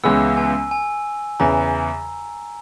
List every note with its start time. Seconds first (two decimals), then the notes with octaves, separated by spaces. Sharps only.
0.04 C#2 C#3 E3 G#3 B3 E6
0.37 G#5
0.71 G#5
1.40 E2 C#3 E3 A#5